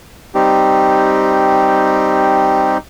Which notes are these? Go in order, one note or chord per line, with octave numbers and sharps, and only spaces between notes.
G3 C4 D#4 G4